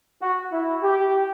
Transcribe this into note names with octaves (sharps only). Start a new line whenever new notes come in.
F#4
E4
G4